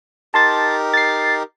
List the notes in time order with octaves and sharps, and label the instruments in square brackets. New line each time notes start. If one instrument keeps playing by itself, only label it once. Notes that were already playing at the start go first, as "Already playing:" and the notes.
[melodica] D#4 G4 A#4 [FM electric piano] A5 C6 A6
[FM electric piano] A6 C7